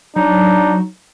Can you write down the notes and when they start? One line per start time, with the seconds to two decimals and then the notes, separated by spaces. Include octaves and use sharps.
0.16 F#3 D4 D#4